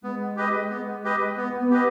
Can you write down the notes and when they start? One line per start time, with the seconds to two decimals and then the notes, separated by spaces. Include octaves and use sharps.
0.03 G#3 B3
0.36 G4 B4 D#5
0.70 B3
1.04 G4 B4 D#5
1.37 B3
1.60 B3
1.71 G4 B4 D#5